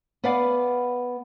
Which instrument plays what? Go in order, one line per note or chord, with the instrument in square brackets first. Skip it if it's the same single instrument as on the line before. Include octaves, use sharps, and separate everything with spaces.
[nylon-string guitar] B3 B4 D5 F5 F#5 A5